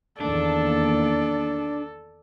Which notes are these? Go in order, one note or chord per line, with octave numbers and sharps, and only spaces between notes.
E2 D#3 A#3 D4 A4 D5